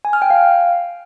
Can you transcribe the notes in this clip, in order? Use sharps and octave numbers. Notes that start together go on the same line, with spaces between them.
G#5
F6
G5
F5